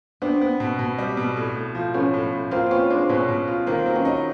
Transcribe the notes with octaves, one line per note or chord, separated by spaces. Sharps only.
B3 C4 D4
B3
B2
B2
G3
B2
A2
A2
F3
A2 B3 C#4
A2
A2
A#3 C4 F4
B3 C#4 F4
G#3 C4 D4
B2 B3 C#4
B2
F4
D#3 A#3 C4
F#3
B3 C#4
D#4